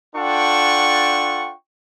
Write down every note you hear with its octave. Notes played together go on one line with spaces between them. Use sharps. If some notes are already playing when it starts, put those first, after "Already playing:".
D4 F4 A4 F#5 G5 C#6